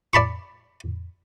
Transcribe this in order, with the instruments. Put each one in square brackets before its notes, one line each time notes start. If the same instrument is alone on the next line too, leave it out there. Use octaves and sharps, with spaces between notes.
[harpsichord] D5 A5 B5 C#6